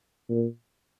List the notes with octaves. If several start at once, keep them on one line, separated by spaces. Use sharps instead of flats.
A#2